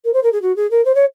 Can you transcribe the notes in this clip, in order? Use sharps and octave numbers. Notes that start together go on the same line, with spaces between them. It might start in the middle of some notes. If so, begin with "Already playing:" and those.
A#4
C5
A#4
G#4
F#4
G#4
A#4
C5
C#5